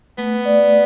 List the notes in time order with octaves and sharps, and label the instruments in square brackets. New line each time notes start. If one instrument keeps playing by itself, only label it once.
[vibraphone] A3 [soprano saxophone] B3
[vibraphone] D5